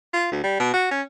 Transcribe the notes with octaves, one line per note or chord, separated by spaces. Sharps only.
F4
D2
G3
B2
F#4
C#4